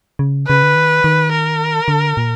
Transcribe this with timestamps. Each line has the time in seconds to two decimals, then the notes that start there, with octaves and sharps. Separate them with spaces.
0.19 C#3
0.47 C#3 B4
0.63 D3
0.75 D#3
1.04 D#3
1.31 A#4
1.88 D3
2.17 A#2